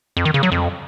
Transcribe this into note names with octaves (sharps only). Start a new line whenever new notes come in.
F2
D#3
C#3
F#3
F2